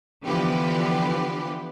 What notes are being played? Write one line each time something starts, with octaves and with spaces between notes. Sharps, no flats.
D3 E3 F3 B3 G4 B4